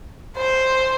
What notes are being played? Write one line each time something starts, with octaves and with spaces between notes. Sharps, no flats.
C5